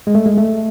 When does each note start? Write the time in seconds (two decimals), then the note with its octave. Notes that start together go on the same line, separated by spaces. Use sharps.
0.07 G#3
0.15 A3
0.26 G#3
0.38 A3